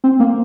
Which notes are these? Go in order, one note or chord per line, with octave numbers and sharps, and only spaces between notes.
C4
A#3